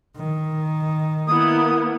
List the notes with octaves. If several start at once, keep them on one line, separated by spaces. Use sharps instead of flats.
D#3
A#3 B3 E4 D#6